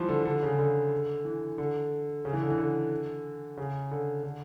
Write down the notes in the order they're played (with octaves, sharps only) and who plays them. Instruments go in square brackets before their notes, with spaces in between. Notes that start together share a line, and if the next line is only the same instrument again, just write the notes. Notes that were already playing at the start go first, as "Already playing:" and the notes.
Already playing: [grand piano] E3 F3 G3
D3
D3
C#3
D3
E3
D3
C#3
E3
D3
E3
D3
C#3
D3
D3